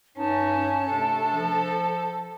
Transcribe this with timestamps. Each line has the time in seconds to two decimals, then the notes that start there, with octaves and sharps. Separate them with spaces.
0.17 G2 C#4 D#4 A5
0.90 C3 A3 D4 A4
1.34 F3